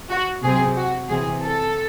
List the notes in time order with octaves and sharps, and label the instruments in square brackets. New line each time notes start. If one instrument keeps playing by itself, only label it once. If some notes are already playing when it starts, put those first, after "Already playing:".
[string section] F#4
C3 F#3 C4 G#4
F#4
C3 E3 C4 G#4
A4